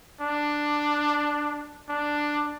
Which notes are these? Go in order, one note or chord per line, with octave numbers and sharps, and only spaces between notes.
D4
D4